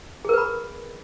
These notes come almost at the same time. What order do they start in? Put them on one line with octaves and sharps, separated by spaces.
G#4 A#4 B4 B5